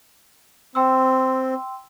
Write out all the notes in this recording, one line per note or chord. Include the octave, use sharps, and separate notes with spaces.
C4 G5 C6 E6